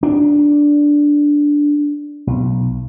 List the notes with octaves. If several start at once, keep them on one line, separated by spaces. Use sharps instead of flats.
D4
B1